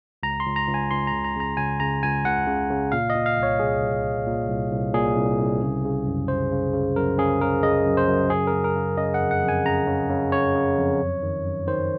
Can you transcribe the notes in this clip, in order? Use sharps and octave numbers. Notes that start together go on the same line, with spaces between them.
C#2 A#5
C6
C#2
A#5
C#2
G#5
C#2 C6
C#3 A#5
A#5
C#3 A#5
C#2 G#5
C#3 A#5
C#2 G#5
C#2 F#5
C#3
C#3
A#2 F5
D#5
A#2
F5
C2
C#5
C2 G#4
C2
C2
A#2
C2
C2
A#2 G#4
C2
C2
C#3
C#3
F#2
C#3 C5
C#3
C#3
F#2 A#4
C#3 G#4
C#3 A#4
C#3 D#5
F#2
C5
F#2
C#3 G#4
A#4
C#3
A#4
C#3
C#3 D#5
F#5
F2
F#5
F2
G#5
C#3 A#5
C#3
C#3
C#3 C#5
C#3
F2
F#2
D#3
F#2
D#3 C5